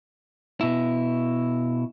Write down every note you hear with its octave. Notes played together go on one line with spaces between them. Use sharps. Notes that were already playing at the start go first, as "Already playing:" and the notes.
B2 E4